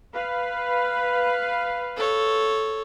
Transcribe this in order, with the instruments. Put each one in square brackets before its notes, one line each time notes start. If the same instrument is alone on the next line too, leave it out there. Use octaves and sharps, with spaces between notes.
[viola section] B4 F5
[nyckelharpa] A4 C#5